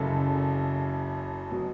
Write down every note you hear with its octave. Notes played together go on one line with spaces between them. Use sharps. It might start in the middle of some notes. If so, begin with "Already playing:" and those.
Already playing: F#1 F#2 C#3 A4
B2 F#3